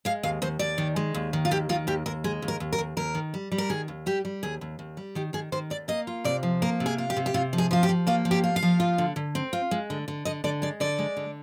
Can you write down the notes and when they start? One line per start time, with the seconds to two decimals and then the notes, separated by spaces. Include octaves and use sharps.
0.05 G#3 F5
0.23 D#2 F5
0.42 D#2 C5
0.59 D#2 D5
0.78 D#3
0.96 G#3
1.14 D#2
1.33 D#3
1.45 F4
1.51 D#2 G4
1.69 D#3 F4
1.87 D#2 G4
2.06 D#2 A#4
2.24 G#3 G#4
2.42 D#2
2.48 A#4
2.60 D#2
2.73 A#4
2.78 D#2
2.97 D#2 A#4
3.15 D#3
3.34 G3
3.52 G3
3.58 A#4
3.70 D#3 G#4
3.88 D#2
4.06 G3 G4
4.25 G3
4.43 D#2 G#4
4.61 D#2
4.79 D#2
4.97 G3
5.15 D#3 G4
5.33 D#3 G#4
5.52 D#3 C5
5.70 D#2 D5
5.88 A#3 D#5
6.07 F4
6.24 C3 D5
6.43 F3
6.62 A#3 A#4
6.80 C3
6.86 G#4
6.98 F4
7.10 G4
7.17 C3
7.26 G4
7.34 C3 F4
7.53 F3
7.58 G#4
7.71 F3 F4
7.83 G4
7.89 F3
8.07 A#3 F4
8.25 F3
8.31 G4
8.44 F4
8.56 F5
8.63 F3
8.80 F4
8.98 D3
9.16 D3
9.35 C4
9.53 F4
9.71 G#3
9.90 D3
10.08 D3
10.25 D3 D#5
10.44 D3 D5
10.62 G#3 D5
10.80 D3 D5
10.99 G#3
11.17 D3